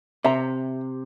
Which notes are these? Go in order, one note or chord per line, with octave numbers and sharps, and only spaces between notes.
C3 E5 A#5